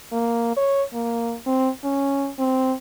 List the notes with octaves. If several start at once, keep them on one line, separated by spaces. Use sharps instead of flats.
A#3
C#5
A#3
C4
C#4
C4